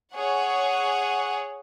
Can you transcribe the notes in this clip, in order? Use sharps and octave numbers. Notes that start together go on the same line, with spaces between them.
G#4 C#5 F#5